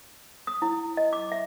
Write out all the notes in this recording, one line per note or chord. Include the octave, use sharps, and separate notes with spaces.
D#6
E4
D#5
D6
E5